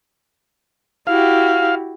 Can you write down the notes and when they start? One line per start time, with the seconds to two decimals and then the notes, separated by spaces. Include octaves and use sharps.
1.07 E4 F#4 G4 F5